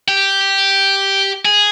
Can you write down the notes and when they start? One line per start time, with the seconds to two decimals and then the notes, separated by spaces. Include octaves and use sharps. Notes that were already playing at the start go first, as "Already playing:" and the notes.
0.08 G4
1.45 G#4